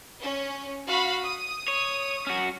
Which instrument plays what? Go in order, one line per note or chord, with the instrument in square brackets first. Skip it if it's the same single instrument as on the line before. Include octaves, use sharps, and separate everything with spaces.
[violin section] C#4
F#4 F5 B5
D#6
[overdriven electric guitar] C#5
C#4 F#4